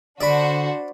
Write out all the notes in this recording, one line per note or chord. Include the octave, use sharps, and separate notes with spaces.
D3 D4 F#4 C5 D5 B5